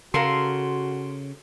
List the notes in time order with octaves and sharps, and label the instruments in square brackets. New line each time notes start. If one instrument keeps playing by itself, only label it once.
[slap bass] C#3 [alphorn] F#4 [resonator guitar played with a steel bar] A4 A#4 F5 [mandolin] C6